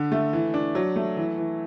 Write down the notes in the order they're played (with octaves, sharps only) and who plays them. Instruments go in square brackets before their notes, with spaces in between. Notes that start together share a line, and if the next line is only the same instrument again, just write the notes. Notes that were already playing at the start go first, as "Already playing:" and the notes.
Already playing: [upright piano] D3
A3
E3
D4
F#3
A3
E3
E3